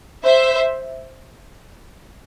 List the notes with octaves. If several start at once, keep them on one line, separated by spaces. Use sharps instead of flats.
C5 E5